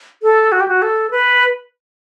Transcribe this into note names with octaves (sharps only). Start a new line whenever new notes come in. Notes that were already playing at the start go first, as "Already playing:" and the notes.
A4
F#4
G4
F#4
A4
B4